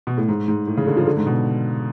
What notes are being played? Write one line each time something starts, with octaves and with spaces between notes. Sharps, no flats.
B2
A2
G#2
G#2
A2
C#3
D3
F3
D3
G#2
B2